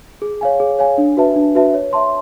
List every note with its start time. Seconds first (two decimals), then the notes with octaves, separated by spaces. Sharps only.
0.22 G#4
0.41 C#5 F5 G#5
0.60 G#4
0.79 C#5 F5 G#5
0.98 D4
1.17 F#4 B4 E5 A5
1.36 D4
1.55 F#4 B4 E5 A5
1.74 C#5
1.93 E5 A5 C6